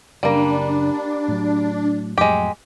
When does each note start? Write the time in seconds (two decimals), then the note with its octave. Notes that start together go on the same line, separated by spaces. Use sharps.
0.23 F#1 C#3 G3 A#3 D4
1.28 A2 F#3
2.18 F2 A2 F#3 G#3 G4